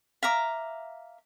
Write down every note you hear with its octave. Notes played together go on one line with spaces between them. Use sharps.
E5 F5 A#5 D6